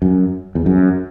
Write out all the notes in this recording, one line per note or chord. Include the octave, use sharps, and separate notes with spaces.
F#2
E2
F#2